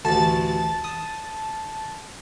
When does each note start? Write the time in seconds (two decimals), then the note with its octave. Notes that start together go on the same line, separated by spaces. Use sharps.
0.05 A1 D2 A5 A6
0.84 D#6